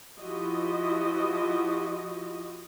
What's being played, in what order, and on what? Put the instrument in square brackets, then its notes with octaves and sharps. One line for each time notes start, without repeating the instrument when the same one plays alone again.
[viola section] F3 E4 F#4 G4 D#5